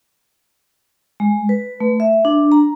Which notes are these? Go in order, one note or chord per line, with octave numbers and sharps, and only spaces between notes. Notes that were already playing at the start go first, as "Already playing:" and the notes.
G#3
B4
A3
E5
D4
A#5